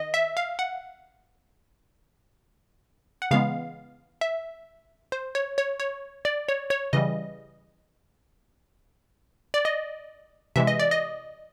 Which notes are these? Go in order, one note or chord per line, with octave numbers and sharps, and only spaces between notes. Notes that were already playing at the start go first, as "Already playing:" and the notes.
Already playing: D#3 D#5
E5
F5
F#5
F#5
C#3 E3 G#3 B3 F5
E5
C5
C#5
C#5
C#5
D5
C#5
C#5
C#3 E3 G3 D#5
D5
D#5
C3 E3 G#3 E5
D#5
D5
D#5